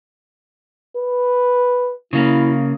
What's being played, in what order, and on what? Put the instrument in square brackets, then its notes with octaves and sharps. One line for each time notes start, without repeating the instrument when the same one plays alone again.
[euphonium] B4
[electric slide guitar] C#3 A#3 [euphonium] E4